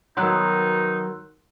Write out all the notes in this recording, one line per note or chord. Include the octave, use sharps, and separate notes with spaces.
D#3 F#3 B3 D#4 C6 E6 F#6